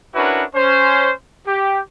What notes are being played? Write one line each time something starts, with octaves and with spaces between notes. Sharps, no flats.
C#4 D4 E4 F#4 A#4 B4
C#4 C5
G4